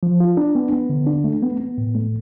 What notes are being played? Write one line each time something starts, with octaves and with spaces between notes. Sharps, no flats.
F3
F4
D4
B3
B3
D3
D4
A3
B3
B3
A2
A3